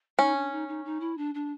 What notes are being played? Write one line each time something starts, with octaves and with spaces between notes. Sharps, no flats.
C#4 D#4
D4
D#4
D#4
D#4
E4
D4
D4